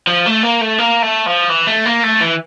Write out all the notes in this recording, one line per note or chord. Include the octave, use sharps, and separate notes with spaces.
F3
A3
A#3
A3
A#3
A3
F3
E3
A3
A#3
A3
E3